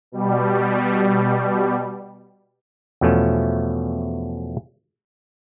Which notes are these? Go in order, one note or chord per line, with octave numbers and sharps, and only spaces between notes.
B2 G3
E2 B2 F3 A3 C#4